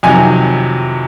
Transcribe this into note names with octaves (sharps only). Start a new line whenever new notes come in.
F2 C3 D#3 F#3 G#5